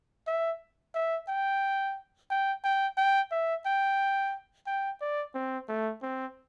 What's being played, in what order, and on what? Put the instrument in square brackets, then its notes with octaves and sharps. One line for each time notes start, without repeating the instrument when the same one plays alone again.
[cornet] E5
E5
G5
G5
G5
G5
E5
G5
G5
D5
C4
A3
C4